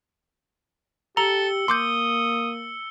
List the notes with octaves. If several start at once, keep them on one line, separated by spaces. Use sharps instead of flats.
G4 A4 A#5 E6 C#7 G7
A#3 C6 D6 D#6 G6